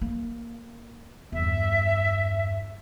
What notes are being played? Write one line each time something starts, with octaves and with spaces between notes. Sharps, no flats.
A#3
E2 G2 E5